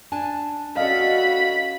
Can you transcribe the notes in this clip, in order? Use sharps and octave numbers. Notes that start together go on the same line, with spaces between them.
D4 G#5 A5
C#4 F#4 A4 D5 D#5 F5 B5